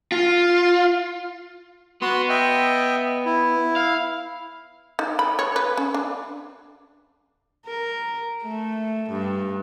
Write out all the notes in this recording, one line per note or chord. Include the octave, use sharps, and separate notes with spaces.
F4
B3 F#4 C6
D#5 E5 G5
E4
F5
D#4
B5
C#5
B4
C#4
D4
A#4
A3
G2